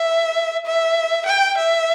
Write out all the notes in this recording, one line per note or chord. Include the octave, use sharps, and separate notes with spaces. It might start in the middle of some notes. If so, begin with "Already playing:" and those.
Already playing: E5
E5
G5
E5